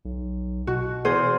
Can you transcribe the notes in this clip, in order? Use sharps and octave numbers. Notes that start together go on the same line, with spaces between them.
B1
B2 F#4
E2 G#4 C5